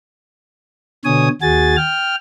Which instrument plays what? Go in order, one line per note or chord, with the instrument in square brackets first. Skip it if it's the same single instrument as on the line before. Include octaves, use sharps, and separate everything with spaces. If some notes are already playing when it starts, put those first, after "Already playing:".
[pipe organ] B2 D3 C#5 G#5 D#6
D#2 F#4 G#4 G#5 A6
G5 F6